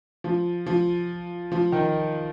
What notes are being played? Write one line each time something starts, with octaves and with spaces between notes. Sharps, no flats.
F3
F3
F3
D#3